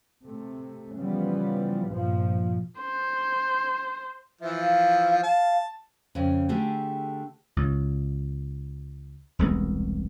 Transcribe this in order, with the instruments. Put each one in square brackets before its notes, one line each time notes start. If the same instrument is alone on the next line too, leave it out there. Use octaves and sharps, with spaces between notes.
[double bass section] C3 A3
C#3 E3 F3 G3 B3
A#1 G2 A#2 F3
[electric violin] C5
[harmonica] E3 F3 [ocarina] E5
[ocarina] F5
[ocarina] F5 [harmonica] A5
[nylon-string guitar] F2 C#3
D3 A3 G4 G#4
[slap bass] C#2
E1 C2 G#3 B3